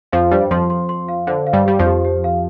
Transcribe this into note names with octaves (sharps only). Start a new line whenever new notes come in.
F2 F3 F5
G2 G3 C5
F2 F3 C6
C6
C6
F5
D3 C5
F5
G2 G3
G3 G4
F2 F3
G4
G4
F5